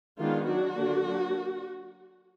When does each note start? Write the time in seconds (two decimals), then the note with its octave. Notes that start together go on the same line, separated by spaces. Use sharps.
0.19 D#3 G#3 B3 D4 F4
0.47 F#3 D4 F#4
0.76 D3 F#3 A#3 D4
1.06 F#3 A#3 D4